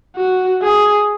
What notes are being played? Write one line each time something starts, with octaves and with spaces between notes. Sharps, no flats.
F#4
G#4